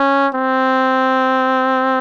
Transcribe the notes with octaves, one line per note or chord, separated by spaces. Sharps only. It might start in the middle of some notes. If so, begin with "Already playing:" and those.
Already playing: C#4
C4